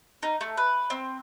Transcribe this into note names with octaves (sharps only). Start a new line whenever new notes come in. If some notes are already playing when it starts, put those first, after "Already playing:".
D#4
A3
B4
C4